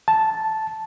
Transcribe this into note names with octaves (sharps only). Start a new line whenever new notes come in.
A5